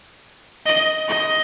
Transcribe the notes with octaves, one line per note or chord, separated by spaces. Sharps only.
D#5
D#5